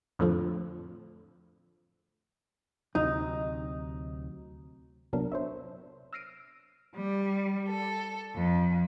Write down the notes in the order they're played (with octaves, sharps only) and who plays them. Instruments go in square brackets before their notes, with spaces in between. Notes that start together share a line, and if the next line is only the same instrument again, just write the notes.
[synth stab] F2 A2 D3 F3
[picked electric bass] D2 C3 F#3 [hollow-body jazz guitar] D#4
[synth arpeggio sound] C3 F#3 B3 D4 A#4
C5 C#5 E5
E6 F6 A#6 C7 D7 D#7
[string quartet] G3
A4
F2